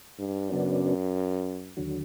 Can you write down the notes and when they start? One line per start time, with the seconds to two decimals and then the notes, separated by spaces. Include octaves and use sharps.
0.19 G2
0.49 F#2 C#3 F#3 B3 D4
1.77 D#2 D3 F#3